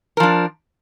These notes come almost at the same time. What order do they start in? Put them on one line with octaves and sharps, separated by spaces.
A#4 F3 D4